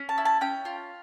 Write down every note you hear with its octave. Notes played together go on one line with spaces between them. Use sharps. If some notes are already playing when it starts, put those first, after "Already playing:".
Already playing: C#4
A5
E4
A5
C#4 G5
F4